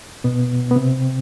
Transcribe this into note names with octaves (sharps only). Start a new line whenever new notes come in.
B2 B3
B3
C3 C4